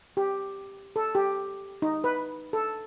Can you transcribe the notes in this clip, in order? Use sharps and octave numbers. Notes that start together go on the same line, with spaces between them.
G4
A4
G4
D#4
B4
A4